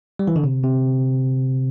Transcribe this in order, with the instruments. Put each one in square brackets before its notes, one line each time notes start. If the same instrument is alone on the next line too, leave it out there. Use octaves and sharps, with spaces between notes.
[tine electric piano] G3
E3
D3
C3
C3